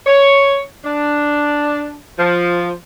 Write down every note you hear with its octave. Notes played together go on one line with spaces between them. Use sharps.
C#5
D4
F3